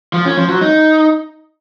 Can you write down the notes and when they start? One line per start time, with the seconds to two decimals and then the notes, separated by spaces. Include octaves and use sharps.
0.13 F3
0.25 C#4
0.37 F3
0.49 F#3
0.61 D#4